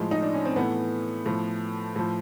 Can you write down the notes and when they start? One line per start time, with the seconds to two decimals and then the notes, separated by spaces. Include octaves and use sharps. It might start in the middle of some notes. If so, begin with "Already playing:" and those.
Already playing: A2 F3 G#3
0.11 D#4
0.22 D4
0.34 C#4
0.45 C4
0.56 A2 E3 A3 B3
1.26 A2 F3
1.96 A2 F3